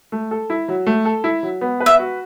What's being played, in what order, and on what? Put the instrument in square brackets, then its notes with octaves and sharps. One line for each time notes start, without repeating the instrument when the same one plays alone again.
[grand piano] A3
A4
E4
F#3
A3
A4
E4
F#3
B3
B4
[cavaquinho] E5
[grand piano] F#4